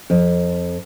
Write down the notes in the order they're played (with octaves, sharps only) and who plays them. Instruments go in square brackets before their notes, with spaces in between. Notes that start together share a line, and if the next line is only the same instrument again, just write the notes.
[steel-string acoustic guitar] F2